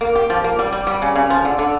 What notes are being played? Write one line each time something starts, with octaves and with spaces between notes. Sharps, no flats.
A#3
G4
F3
A#3
G3
G3
G3
C#3
C#3
F3
D3
D3